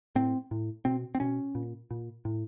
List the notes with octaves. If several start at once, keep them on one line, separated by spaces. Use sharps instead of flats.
A2 C4
A2
B2 C4
C4
B2 C#4
A#2
A#2
A2